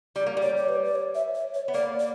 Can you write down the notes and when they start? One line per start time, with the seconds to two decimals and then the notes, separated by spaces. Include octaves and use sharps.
0.16 G3 D5
0.26 A#3
0.37 G3
0.42 C#5
0.57 C#5
0.69 B4
0.84 D5
0.95 C#5
1.15 E5
1.35 C#5
1.54 C#5
1.68 B3
1.74 A#3 D5
2.00 D5